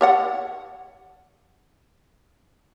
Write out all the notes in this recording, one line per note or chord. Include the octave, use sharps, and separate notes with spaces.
G4 C#5 F#5